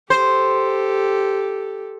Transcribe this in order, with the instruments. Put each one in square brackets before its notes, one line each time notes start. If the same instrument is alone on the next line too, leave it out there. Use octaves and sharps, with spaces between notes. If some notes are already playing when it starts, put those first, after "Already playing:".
[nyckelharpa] G4 A4 [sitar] C5